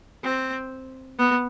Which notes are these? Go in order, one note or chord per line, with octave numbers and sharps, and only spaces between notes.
C4
B3